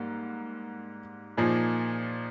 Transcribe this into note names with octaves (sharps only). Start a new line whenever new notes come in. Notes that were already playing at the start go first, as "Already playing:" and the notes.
Already playing: G#2 G3 A#3
A#2 F3 A#3 D#4 G#4